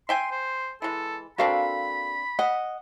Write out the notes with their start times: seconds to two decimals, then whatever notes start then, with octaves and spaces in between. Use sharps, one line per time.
0.09 E5 G5 G#5 C6
0.31 C5
0.82 E3 G#3 A4
1.38 A#3 C4 D4 F#4 A4 F5 B5
2.39 D#5 F#5